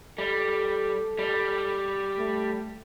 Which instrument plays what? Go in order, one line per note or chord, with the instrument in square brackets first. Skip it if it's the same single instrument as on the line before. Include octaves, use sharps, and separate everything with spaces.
[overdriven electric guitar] G3 [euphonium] A4
[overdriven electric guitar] G3
[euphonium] A3